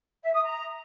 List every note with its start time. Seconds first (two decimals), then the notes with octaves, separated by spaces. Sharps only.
0.22 E5
0.33 D#6
0.44 A#5